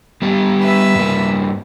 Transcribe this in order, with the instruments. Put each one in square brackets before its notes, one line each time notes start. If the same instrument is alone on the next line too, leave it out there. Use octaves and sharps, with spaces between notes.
[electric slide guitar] G3 B3 G4
[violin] B4 E5
[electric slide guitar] G2 A#3